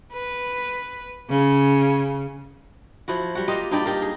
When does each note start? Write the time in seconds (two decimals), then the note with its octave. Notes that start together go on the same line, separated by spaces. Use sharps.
0.13 B4
1.29 C#3
3.08 F3 E4 F#4
3.35 G3 F#4
3.48 A#3 F4 G4 D#5
3.71 G2 D#4 G4 D5
3.86 D#4 G4 A#4
4.02 G#4